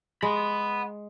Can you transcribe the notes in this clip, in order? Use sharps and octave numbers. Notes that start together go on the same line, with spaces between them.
G#3 F#5 B5